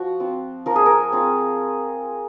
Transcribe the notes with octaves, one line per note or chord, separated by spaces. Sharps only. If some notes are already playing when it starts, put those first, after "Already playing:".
Already playing: F3 F#4
C4 F4
F3 A#4
G#4
A#4
C4 F4